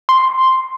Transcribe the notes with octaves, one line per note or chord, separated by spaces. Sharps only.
C6